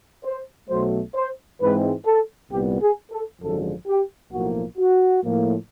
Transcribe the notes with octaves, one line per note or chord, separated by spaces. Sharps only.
C5
B1 B2 F#3 A3 C5
C5
G#2 E3 G#3 C4 B4
A4
C2 A#2 G3 B3 G4
G#4
A4
G#1 F#2 D3 F3 G#3 A4
G4
B1 A2 F3 A#3 F#4
F#4
A2 F3 A#3